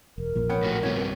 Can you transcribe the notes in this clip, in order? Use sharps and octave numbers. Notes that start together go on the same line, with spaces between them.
E1 A#4
A#1 A#2 F3
B3 C#4 G5
A2 F#4
G2 C3 B3 C#5